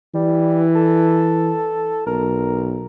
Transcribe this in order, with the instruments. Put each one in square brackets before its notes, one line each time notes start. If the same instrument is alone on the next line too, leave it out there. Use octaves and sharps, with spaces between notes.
[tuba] E3 [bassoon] G3
[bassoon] A4
[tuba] B1 [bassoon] A#4